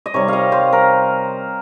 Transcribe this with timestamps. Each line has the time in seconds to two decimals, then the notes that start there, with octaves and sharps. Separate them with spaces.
0.06 D#5
0.14 C3 D#3 G3 C#5
0.28 D#5 F5
0.52 C5
0.73 A#4